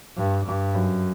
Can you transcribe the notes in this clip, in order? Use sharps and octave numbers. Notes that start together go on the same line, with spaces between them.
G2
G2
F#2